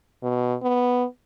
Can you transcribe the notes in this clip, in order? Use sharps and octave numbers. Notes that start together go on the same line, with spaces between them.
B2
B3